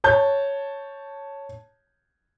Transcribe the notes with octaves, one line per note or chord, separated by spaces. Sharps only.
C#5 A5 G6